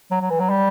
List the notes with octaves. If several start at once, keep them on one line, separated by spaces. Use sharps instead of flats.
F#3
F#3
E3
F#3
G3